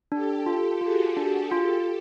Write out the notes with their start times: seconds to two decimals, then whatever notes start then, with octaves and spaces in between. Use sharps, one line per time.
0.11 D4 G4 A4
0.46 F4
0.81 F4 F#4 G#4
1.17 D4
1.51 F4 G4 A4